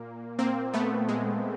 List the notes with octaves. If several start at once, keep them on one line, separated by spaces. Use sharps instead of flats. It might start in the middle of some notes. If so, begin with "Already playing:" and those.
Already playing: A#2 A#3
A#3 C4
A3 B3
G#3